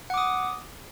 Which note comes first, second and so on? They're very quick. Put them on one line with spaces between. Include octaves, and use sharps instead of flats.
F#5 D6 D#6